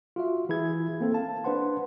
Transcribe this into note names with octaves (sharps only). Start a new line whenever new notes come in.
F4 F#4 E5
E3 E4 G#4 G#6
A#3 C4 A4
F5 A5
D4 B4 C5 F#5 C6